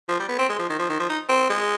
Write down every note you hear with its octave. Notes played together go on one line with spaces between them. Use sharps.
F3
G3
B3
C4
G#3
F3
D#3
F3
D#3
F3
D#4
C4
G#3